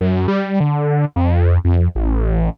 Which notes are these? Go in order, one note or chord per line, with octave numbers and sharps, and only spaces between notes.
F#2
G3
D3
F2
F2
A1